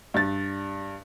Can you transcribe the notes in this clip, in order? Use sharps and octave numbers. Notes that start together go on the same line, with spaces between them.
G2 A6